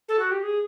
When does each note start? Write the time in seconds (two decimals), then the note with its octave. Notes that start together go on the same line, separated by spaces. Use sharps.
0.09 A4
0.19 F#4
0.31 G4
0.43 G#4